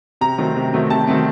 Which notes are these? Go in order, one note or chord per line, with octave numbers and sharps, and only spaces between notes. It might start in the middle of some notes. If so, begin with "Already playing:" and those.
C3 A#5
D#3 F#3 A3 C4
C3
D#3 F#3 A3 C4
C3 A5
D#3 F#3 A3 C4